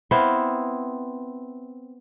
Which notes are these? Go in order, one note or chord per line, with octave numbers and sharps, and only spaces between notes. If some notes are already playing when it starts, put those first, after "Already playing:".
B3 C4 E4 F5